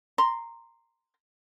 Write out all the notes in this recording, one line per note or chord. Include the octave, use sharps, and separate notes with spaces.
A#5 C6